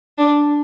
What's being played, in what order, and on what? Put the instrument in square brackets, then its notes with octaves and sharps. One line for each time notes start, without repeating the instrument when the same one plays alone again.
[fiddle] D4